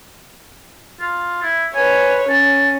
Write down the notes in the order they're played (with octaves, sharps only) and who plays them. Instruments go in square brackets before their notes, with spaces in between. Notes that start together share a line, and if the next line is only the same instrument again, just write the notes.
[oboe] F4
E4
[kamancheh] B4 C#5 [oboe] G#5
[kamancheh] C#4 [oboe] A5